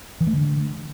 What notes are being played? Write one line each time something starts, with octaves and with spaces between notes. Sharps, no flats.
E3
A3
D3